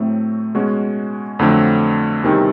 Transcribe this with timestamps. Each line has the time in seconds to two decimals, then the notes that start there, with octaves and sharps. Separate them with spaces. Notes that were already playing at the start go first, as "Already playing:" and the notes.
Already playing: A2 F#3 A3 C4
0.54 B2 G#3 C#4 F#4
1.39 F2 D3 F#3 A3 C4
2.23 E2 C3 D#3 G3 C4